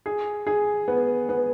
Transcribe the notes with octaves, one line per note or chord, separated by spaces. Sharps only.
G#4
G#4
B3
B3